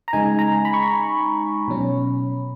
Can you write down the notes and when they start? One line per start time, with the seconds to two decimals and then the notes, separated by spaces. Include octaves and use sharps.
0.08 A#5
0.13 C#3 G#3 D#4 G#5
0.39 A#5
0.65 B5
0.74 C#6
0.83 B5
1.68 B2 F#3 C#4